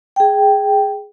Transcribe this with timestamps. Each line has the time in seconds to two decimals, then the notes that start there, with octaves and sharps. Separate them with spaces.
0.16 G#4 G5